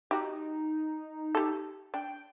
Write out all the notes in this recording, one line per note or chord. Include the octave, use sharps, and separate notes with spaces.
D#4 F#4 G4
G4 A4
D4 G5